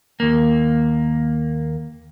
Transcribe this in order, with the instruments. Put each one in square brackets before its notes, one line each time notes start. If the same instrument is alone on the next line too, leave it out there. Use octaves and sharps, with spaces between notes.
[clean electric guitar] D#2 A#3